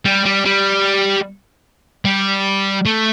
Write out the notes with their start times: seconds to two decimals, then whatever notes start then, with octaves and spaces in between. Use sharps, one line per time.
0.05 G3
0.25 G3
0.45 G3
2.05 G3
2.86 A3